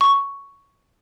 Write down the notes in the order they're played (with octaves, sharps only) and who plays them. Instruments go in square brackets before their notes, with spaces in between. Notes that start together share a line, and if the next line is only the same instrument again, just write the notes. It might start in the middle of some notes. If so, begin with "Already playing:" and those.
[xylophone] C#6